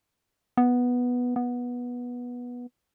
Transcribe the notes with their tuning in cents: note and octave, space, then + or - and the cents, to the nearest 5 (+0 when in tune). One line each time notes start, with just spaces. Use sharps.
B3 -5
B3 -15